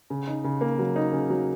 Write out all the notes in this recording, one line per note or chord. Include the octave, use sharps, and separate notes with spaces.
C#3
D#4
C#3
A#3
F#3
D#4
C#3
F#3